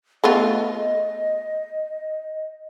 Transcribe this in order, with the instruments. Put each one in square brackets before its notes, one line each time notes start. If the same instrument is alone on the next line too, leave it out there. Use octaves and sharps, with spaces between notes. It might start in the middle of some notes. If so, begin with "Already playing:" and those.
[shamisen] A3 B3 F4 [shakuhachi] D#5